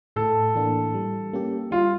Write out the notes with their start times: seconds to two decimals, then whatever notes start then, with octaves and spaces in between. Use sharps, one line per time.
0.16 A2 A4
0.55 E3 A#3 D4
0.94 G3
1.33 A#3 C#4 G4
1.71 G3 F4